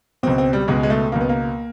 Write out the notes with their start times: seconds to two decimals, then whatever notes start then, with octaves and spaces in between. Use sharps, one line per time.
0.23 C#2 B2 C4
0.38 C4
0.53 G3
0.68 C#2 B2 G#3
0.83 G#3
0.90 A3
1.12 C#2 B2 A#3
1.21 B3
1.29 A#3